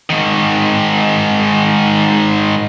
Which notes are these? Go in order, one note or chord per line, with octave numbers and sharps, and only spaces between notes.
G#2 D#3